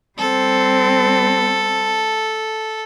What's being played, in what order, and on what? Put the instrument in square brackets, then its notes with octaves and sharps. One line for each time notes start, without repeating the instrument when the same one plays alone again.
[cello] G3 C4 [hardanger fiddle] A4